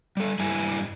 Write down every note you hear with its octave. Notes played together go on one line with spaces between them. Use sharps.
G3 A4
G2 G3 E4 G#5